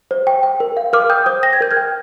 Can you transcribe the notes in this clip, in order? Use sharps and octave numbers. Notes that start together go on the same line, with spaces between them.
C5
G5
G5
A#4
F5
A#4 D6 F6
G5 D#6 G6
C5 D#6 G6
G5 A#6
G#6
A#4 G6
F6 G#6
G5